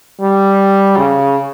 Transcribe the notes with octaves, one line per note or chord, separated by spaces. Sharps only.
G3
C#3